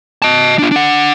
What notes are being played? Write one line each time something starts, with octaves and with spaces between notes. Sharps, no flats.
D#5 A5
D4 F4
D4 F#5